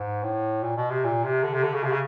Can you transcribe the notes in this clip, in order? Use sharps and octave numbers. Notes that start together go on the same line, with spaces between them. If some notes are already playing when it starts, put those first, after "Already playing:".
Already playing: G#2
A2
A#2
B2
C3
A#2
C3
D3
C3
D3
C#3
C3
C#3